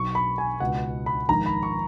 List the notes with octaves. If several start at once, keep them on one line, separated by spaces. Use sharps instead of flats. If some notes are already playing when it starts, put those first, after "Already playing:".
Already playing: B1 B2 C#6
B5
G#5
C#2 B2 F#5
B5
A#1 G#2 D#3 A#5
B5
C#6